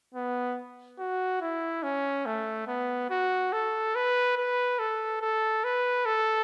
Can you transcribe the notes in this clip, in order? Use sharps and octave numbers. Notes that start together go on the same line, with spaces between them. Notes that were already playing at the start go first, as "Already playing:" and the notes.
B3
F#4
E4
C#4
A3
B3
F#4
A4
B4
B4
A4
A4
B4
A4